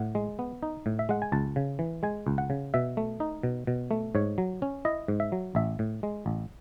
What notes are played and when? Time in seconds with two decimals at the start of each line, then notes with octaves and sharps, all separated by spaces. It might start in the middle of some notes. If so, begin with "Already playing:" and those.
Already playing: A2 F#5
0.15 G#3
0.39 B3
0.63 D#4
0.86 A2
0.99 E5
1.09 G#3 F#5
1.22 G#5
1.32 C#2 A5
1.56 C#3
1.79 E3
2.03 G#3 G#5
2.27 C#2
2.38 F#5
2.50 C#3
2.74 B2 E5
2.97 A3
3.20 D#4
3.43 B2
3.67 B2
3.91 A3
4.15 G#2 C#5
4.38 F#3
4.62 C#4
4.85 E4 D#5
5.08 G#2
5.20 E5
5.32 F#3
5.55 A1 E5
5.79 A2
6.03 G#3
6.26 A1